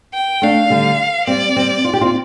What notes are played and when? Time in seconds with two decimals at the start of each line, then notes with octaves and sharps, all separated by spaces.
0.14 G5
0.42 A3 D4 F5
0.70 D3 G3
1.27 G3 C4 D5
1.56 G3 C4
1.84 F4
1.94 G4
2.01 C4 F4